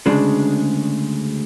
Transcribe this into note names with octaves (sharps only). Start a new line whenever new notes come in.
D2 C#3 G#3 D4